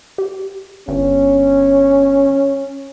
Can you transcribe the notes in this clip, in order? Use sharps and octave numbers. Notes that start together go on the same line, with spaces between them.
G4
G1 C#4